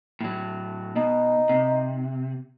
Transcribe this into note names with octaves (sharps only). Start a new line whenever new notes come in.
A2 F#3
B2 D#4
C3